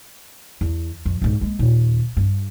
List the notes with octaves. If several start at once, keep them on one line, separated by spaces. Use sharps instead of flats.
E2
F2
C#2 G#2
G#3 A#3
D#2 A#2
G2